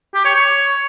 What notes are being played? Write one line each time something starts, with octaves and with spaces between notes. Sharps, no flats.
G4
C#5
C#5